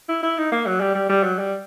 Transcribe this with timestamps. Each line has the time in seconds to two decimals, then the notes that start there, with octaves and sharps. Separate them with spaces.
0.09 E4
0.23 E4
0.38 D#4
0.52 A#3
0.66 F#3
0.80 G3
0.95 G3
1.09 G3
1.24 F#3
1.39 G3